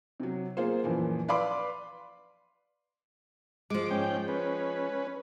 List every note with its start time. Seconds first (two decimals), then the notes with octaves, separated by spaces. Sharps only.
0.20 C3 F#3
0.57 A#3 F4 G#4 C5
0.84 F#2 A#2 E3 F3
1.28 B4 D5 F5 B5 C6 D6
3.70 F3 G#3 D6
3.91 G#2 C#4 G5
4.28 C#4 B4